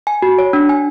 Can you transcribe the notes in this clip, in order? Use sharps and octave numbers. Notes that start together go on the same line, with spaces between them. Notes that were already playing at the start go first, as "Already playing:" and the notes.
G#5
F#4
C#5
D4
G#5